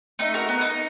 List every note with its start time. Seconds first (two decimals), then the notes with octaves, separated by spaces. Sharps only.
0.19 A3 D#4
0.34 F#4 A#4
0.49 B3
0.61 D#4